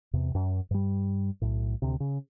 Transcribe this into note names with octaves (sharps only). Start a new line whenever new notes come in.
E2 C3
F#2
G2 G3
B1 A2
D2 C3
C#3